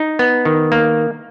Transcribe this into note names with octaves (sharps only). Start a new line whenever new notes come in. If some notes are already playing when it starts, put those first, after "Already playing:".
Already playing: D#4
B3
D#3
A#3